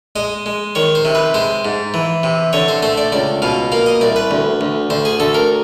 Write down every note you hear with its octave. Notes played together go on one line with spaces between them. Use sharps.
G#3 D#5
G#3
D#3 C#5
C5
C3
B4
G#3 C5
G#2
E3
C3
D3 C#5
C5
A3 C5
D5
C#2 D5
B2 F5
A#3 F5
D#5
C2 D5
B4
D2
D2
D2 C5
G#4
D2 A4
A#4